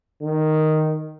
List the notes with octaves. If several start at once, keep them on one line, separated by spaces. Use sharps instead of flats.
D#3